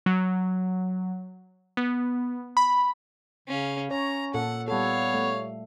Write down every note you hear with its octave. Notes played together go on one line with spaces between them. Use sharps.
F#3
B3
B5
C#3 C#4 F5
C#4 C#5 A#5
A#2 A4 F#5
G3 B3 A4 C#5 F5
A3